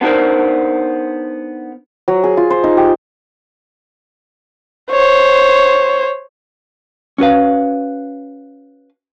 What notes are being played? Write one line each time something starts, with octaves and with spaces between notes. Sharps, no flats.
B3 D4 D#4 F#4 A#4 C5
F#3
G#4
F4
C5
D#4
G4
C5 C#5
C#4 F#4 B4 F5